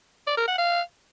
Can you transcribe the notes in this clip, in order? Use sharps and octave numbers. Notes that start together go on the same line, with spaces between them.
D5
A#4
F#5
F5